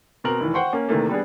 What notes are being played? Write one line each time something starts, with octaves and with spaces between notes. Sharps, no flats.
B2 C4 A#4 F#7
F1 D#3 E3
C5 F#5 G5 C6 C#6
A#3 C#4
E2 C3 D#3 E3 A3 A#3
G3 B3 D4 G#4